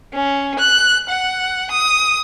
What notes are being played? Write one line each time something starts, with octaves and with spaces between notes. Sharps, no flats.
C#4
F#6
F#5
D#6